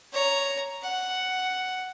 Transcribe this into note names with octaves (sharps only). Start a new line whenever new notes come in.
C#5 A#5
F#5